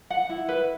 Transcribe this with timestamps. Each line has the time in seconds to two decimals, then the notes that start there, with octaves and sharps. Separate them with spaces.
0.10 F#5
0.29 E4
0.48 B4